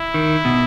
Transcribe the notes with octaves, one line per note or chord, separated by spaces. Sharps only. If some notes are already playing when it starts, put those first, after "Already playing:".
Already playing: E4
D#3
B2